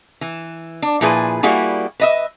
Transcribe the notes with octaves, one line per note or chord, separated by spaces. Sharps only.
E3
D4
A#2 F3 E4 G#4 B4
G3 A#3 E4 F#4 G#4
B4 D#5 E5